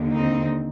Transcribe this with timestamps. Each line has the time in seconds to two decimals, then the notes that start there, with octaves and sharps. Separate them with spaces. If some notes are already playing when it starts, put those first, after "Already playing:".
Already playing: D#2 D3
0.13 C4 D#4